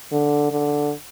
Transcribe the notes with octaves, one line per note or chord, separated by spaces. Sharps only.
D3
D3